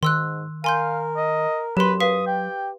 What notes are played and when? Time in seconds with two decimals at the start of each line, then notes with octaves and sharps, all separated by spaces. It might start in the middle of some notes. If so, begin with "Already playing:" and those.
0.03 G#2 D#3 C6 E6 F#6
0.64 A#4 F5 G#5 C6 G6
1.17 D#5
1.77 F#2 F#3 G4 B4 C6
2.00 B4 F5 D#6 B6
2.27 G4 G5